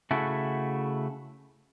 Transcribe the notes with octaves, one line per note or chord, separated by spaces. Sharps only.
C#3 A3 E4 F#4